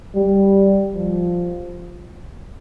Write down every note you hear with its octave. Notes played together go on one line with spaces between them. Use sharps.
G3
F3